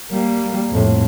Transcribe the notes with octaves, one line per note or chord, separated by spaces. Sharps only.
G3 A#3
F2 A2